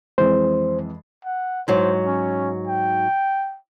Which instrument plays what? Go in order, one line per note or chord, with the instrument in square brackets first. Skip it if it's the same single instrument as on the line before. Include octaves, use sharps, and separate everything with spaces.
[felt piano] F2 E3 G#3 [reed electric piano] C5
[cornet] F#5
[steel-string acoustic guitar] G#2 F#3 [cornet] C5
[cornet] C#4
G5